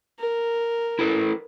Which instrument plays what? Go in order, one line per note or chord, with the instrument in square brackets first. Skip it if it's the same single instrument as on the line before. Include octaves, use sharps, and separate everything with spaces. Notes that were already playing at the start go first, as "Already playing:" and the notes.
[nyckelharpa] A#4
[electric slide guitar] E4 A4 B4